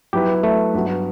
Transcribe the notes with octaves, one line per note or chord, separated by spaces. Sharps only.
F#3 B3 E4 G4 B4
A3
G2 F#3 B3 F#4